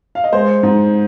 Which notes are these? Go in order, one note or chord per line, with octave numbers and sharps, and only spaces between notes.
F5
D#5
G#3 C5
G#2